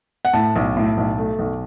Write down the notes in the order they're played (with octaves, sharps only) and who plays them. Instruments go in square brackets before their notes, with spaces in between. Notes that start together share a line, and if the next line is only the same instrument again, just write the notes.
[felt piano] F#5
A2 A5
B1
A2
B1
A3
B1